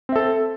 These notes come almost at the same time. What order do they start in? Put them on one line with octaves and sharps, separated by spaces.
C4 E5 A4